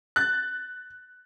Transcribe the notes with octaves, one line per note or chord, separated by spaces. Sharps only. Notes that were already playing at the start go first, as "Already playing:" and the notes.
F#6 A6